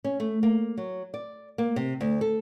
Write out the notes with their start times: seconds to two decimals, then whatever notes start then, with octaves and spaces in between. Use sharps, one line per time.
0.04 C#4
0.20 A3
0.43 A#3
0.77 F#3
1.14 D5
1.58 A#3
1.76 C3
2.01 D2
2.21 A4